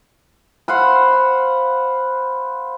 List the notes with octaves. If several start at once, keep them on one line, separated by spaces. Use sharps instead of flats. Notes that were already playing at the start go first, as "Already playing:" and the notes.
C5 F5 F#5 B5